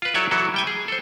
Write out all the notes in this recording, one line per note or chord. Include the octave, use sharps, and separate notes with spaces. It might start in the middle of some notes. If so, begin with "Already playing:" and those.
F4 B4
F#3 E4 A4 C#5 D5 E5
E3 F#3 E4 F#4 A4
G3 G5 G#5
G#4
A4 C5